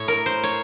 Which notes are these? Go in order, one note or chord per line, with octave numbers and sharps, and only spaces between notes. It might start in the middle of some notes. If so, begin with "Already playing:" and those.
Already playing: A2 C#5
A#4
C5
C#5